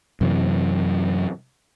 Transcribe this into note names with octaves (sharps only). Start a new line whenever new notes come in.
F#2 C3 E3